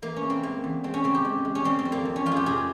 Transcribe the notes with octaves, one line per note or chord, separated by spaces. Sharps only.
E3 A#3
C#4
C#3
C4
G#3 A#3
E2
G#3 C4
C#4
C#3 C4
G4
G#3
G#3
C#4
G3 C4
C4
F2
A#3
F2
C#4
F2 F4
G4 G#4
C3 G#4